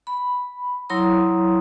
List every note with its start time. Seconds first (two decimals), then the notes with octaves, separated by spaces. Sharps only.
0.07 B5
0.89 F#3 E4 C#5 A#5 C6 D#6